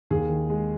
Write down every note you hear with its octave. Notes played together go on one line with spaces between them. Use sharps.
D#2 G#4
D#3
G#3